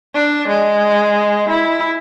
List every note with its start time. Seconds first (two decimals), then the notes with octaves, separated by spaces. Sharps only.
0.15 D4
0.48 G#3
1.49 E4